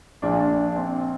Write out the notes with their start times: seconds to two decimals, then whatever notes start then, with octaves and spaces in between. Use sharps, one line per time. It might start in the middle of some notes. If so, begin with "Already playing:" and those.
0.22 A#1 A#2 D4
0.32 F4
0.40 D4
0.58 D4
0.76 C4